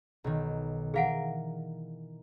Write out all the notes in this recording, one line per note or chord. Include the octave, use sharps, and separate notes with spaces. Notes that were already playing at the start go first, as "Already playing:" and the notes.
B1 D#3
E3 G#4 A#4 F5 F#5 D7